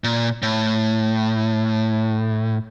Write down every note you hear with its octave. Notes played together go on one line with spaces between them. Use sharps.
A#2
A2